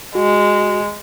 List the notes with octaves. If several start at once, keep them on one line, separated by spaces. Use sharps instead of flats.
G#3 F#4